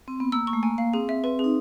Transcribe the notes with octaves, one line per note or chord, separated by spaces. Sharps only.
C4
B3
A#3 E6
C#6
A3
A#3 G#5
F5
C4 G#4
E5
C4 B4
G#4
D#4